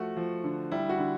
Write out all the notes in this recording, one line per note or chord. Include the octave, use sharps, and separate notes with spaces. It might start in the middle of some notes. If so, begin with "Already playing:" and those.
Already playing: F3 A3 F#4
F3
D3
G3 E4
F#4
D3